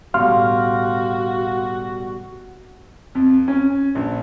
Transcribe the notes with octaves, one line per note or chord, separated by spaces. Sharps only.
A1 B2 D3 G3 F#4 F5 C6 F6
F2
C#4
A#1